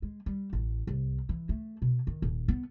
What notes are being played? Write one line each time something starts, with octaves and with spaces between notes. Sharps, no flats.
G#3
G3
A1
C2
E3
A3
B2
D#3
D#1
B3